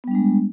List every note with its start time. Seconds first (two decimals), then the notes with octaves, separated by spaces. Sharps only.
0.04 B3
0.08 G3
0.11 D4
0.15 G#3